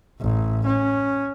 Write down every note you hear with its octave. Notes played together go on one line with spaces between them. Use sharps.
A1
C#4